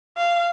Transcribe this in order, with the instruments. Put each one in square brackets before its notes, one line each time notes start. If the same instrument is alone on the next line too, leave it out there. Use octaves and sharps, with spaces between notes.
[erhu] F5